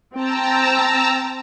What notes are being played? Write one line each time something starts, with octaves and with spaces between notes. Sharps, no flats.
C4 G5 A5 A#5 E6